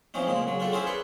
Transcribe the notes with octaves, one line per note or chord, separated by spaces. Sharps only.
E3 F3 C4 C#4 D#4
A#2 C#3 F3 G#3
C#3 F#3
D4 F4 G4 A4
C#4 E4 G#4 A#4 C5 E5
B4 C#5 D5 C6